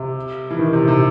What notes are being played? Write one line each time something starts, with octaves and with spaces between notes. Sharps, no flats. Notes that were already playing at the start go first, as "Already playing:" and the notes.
Already playing: C3
E3
D#3
C3
C3